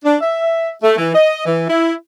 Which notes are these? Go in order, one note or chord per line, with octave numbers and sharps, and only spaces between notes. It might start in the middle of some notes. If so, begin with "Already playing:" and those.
D4
E5
A3
E3
D#5
E3
E4